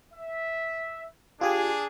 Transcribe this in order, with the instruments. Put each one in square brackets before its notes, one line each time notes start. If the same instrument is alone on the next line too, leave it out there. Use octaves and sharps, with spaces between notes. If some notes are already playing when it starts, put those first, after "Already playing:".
[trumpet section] E5
[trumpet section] D4 G#4 [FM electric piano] F4 G4 G#5